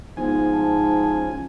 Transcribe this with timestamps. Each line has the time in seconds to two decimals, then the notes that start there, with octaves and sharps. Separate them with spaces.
0.17 G#2 F3 B3 G#5
0.52 A5
1.12 C#4